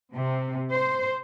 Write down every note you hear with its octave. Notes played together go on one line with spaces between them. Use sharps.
C3
C5